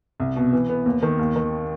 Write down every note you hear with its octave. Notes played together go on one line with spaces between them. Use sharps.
C2
B2
E3
B3
D#2
D#3
D#2
D#3